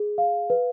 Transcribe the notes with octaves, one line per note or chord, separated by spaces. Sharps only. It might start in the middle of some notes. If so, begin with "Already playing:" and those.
Already playing: G#4
F5
B4